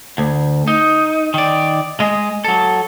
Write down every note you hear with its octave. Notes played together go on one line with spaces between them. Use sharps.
D2
D#4
D#3 D5
G#3 D#5
F#3 A4